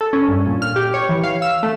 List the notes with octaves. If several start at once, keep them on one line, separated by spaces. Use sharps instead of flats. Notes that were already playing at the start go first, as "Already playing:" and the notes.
A4
C#4
G2
A#2
F6
G4
C#5
E3
F5
E6
A3